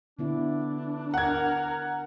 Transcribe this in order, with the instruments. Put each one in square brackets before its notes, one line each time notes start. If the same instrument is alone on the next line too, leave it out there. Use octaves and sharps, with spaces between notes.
[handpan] D3 B3 E4 [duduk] D4
[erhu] A#4 [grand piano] F#5 G#6